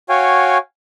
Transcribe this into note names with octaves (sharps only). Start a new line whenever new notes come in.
F#4 C#5 F5 G5 G#5